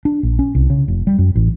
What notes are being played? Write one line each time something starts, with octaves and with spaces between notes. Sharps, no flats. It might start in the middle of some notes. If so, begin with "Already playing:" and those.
D4
A#1
C#4
C2
C#3
F1
G3
F#2
A1